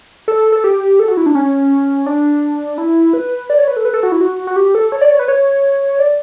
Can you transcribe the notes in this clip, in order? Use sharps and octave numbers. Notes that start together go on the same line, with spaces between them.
A4
A4
G4
A4
F#4
E4
D4
C#4
D4
E4
B4
D5
C#5
B4
A4
B4
A4
F#4
E4
F#4
F#4
G4
A4
C#5
D5
C#5
B4
C#5
D5